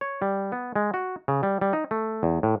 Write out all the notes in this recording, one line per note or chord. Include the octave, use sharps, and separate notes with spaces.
C#5
G3
B3
G#3
F#4
C#3
G3
G3
D#4
A3
E2
A2